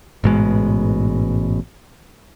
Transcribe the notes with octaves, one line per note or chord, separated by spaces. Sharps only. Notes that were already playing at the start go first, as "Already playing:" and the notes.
A1 G#2 B2 G#3